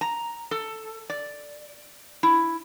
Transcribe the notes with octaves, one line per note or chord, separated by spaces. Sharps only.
A#5
A4
D5
E4